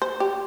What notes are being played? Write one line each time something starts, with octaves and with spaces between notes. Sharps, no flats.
C5
G4